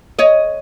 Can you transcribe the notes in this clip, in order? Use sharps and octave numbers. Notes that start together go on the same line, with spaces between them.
C#5 D#5